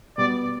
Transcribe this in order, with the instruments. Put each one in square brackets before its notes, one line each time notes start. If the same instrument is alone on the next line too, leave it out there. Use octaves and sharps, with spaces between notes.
[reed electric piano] B2 G3 B3 [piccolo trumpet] D5